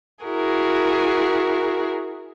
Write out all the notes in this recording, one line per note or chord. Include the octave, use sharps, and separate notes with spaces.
E4 F#4 G#4 A#4